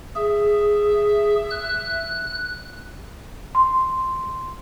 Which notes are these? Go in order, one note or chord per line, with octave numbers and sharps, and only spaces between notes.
G#4 E5
F#6
C6